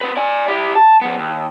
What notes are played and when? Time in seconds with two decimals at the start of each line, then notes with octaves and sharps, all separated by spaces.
0.01 C4 B4
0.17 D5 G#5
0.48 E4 G4
0.75 A5
1.01 F3 B3
1.19 D#2